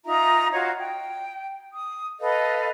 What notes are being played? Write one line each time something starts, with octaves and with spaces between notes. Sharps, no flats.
D#4 F4 E5 A#5
F4 F#4 C#5 D#5
G5
D#6
A4 B4 D#5 F5